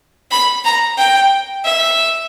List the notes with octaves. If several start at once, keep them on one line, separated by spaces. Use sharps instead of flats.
B5
A#5
G5
E5